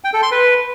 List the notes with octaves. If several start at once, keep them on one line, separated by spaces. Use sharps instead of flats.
G5
A4
C6
B4